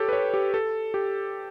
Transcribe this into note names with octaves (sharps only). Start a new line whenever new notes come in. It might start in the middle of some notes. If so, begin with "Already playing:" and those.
Already playing: G4 A4 C#5
B4
C#5
G4
A4
G4